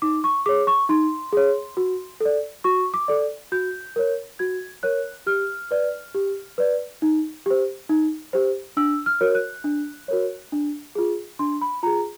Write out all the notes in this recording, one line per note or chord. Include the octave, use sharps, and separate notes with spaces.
D#4 D6
C#6
G#4 C#5 D6
C#6
D#4 C6
G#4 C#5
F#4
A4 D5
F#4 C#6
D6
A4 D5
F#4 G6
A#4 C#5
F#4 G#6
A#4 C#5 F#6
G4 F6
B4 D5
G4
B4 D5
D#4
G4 C5
D#4
G4 C5
D4 E6
F6
F#4 A#4 C#5
F#6
D4
F#4 A#4 C#5
D4
F4 G#4
D4 C6
B5
F4 G#4 A#5